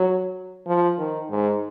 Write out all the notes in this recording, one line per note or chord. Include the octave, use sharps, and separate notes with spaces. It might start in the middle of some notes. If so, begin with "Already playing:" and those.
Already playing: F#3
F3
D#3
G#2